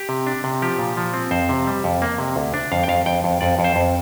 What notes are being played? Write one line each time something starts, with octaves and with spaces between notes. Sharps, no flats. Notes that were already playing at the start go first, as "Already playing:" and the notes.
Already playing: G4
C3
D4
C3
F3 G4
A#2
F3
C4
F2 C5
C3
G3
F2
A#3
C3
D2
D4
F2 F5
G5
F2 F5
F2 G5
F2
F2 D5
F2
C5
F2